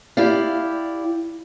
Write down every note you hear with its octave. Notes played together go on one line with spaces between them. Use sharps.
E4 G4 D5 F5